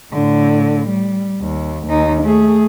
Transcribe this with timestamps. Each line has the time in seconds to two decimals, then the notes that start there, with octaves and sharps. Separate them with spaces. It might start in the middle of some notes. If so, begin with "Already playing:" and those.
0.12 A2 D3
0.88 G3
1.42 D#2
1.87 D#2 D#4
2.22 A3 G#4